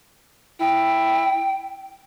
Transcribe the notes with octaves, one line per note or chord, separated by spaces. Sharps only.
E4 G5